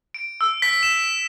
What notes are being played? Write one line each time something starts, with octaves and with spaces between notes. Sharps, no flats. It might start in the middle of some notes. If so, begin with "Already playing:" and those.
D7
E6
B6
E7